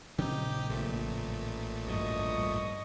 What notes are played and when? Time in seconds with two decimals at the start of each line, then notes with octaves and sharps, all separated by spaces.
0.18 A#1 C#3 F#3 C4 D#4 G4
0.69 A1 A#2 A3
1.87 D2 G2 F3 D#5 C#6